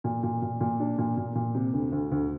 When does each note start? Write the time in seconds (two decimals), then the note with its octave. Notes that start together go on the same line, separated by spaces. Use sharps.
0.04 A#2
0.23 A#2
0.42 A#2
0.60 A#2
0.80 D4
0.98 A#2
1.17 A#2
1.35 A#2
1.55 C3
1.74 D2
1.92 D2
2.12 D2